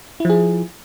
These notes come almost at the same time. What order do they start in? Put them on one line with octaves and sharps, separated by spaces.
E4 F3 G#4